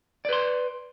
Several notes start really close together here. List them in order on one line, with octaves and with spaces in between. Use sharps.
D5 B4 C6